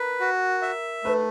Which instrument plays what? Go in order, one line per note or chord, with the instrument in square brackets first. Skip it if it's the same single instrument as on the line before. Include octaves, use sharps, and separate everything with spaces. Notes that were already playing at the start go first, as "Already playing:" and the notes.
Already playing: [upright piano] A#4 [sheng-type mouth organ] B4
[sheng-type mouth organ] F#4
E5
[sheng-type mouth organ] A3 [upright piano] B4